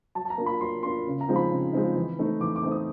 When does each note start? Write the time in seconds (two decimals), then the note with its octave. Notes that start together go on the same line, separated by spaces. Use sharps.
0.15 F#3 A5
0.25 A5
0.30 A#5
0.38 A#3 D4 F4
0.46 B5
0.60 F#3 C6
0.83 A#3 D4 F4 C6
1.06 C#3
1.21 A#5
1.28 F3 G#3 C4 D#4
1.36 B5
1.51 C#3
1.73 F3 G#3 C4 D#4
1.96 E3
2.18 A3 C4 D#4
2.41 E3 D6
2.56 D6
2.63 A3 C4 D#4
2.72 D#6